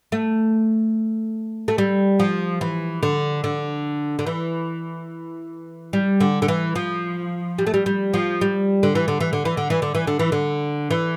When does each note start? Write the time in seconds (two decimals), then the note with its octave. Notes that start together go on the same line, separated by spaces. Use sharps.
0.12 A3
1.68 A3
1.78 G3
2.20 F3
2.61 E3
3.03 D3
3.44 D3
4.19 D3
4.26 E3
5.93 G3
6.20 D3
6.42 D3
6.48 E3
6.76 F3
7.58 G3
7.67 A3
7.74 G3
7.86 G3
8.14 F3
8.41 G3
8.83 D3
8.95 E3
9.08 D3
9.20 E3
9.33 D3
9.45 E3
9.57 D3
9.70 E3
9.82 D3
9.95 E3
10.07 D3
10.19 E3
10.32 D3
10.90 E3